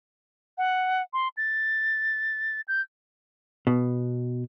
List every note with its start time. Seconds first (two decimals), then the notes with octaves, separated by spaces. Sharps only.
0.58 F#5
1.13 C6
1.37 A6
2.68 G6
3.67 B2